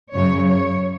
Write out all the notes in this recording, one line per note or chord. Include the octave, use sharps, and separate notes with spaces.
F#2 C#3 F#3 C#5
C#5